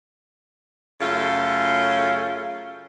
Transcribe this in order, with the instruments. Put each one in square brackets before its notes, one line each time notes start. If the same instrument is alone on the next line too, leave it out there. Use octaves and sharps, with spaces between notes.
[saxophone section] F#2 C#3 A3 F4